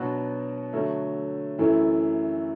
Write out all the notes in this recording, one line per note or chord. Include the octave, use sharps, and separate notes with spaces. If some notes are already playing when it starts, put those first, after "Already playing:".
Already playing: B2 F#3 B3 D4 F#4
D3 F#3 A3
F#2 E3 A3 E4 A4